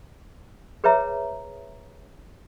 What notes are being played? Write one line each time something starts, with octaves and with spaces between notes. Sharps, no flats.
G#4 B4 C#5 E5 A#5